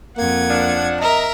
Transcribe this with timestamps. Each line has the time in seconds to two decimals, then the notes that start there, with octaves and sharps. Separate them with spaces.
0.18 F2 A#3 F#5 G#6
0.49 F3 D4
1.01 A#4 D#5 E5 A#5